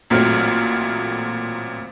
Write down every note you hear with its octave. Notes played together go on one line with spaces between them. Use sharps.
A1 A#2 F#3 A3 C4 F6